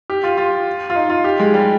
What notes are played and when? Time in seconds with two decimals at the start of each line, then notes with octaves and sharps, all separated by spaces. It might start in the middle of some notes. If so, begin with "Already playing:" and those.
0.10 G4
0.24 F4
0.37 F4
0.90 F4
0.95 D#4
1.10 F4
1.24 G4
1.39 G#3
1.54 G3